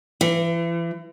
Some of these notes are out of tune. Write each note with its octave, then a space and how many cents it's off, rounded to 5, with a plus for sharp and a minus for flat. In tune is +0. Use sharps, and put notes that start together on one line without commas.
E3 +35